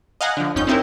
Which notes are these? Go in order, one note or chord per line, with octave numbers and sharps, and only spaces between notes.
D#5 F5 F#5 G#5 A#5
D3 F3
G1 F2 C#4 D#4 G6
C4 C#4 D#4 E4 G4 A#4